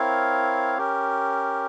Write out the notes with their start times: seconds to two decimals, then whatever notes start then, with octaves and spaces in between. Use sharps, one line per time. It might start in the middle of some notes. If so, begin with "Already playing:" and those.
Already playing: C4 E4 A#4 C#5 F5
0.78 C#4 G4 A#4